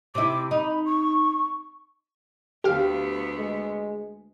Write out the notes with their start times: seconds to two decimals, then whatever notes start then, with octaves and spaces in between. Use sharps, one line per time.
0.15 C3 E4 D6
0.51 D#4 B5
0.86 C#6
2.64 D2 B3 G4 F5
3.38 G#3